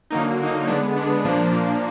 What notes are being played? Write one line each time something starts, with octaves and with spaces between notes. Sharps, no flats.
D3 F#3 A#3 D#4
D3 F#3 A#3 D#4
D3 G#3 B3 D4
D3 G#3 B3 D4
A#2 F3 A#3 D4
A#2 F3 A#3 D4